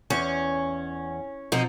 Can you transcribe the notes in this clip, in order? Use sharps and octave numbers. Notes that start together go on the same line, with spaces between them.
E2 C#4
B2 F3 C4 D#4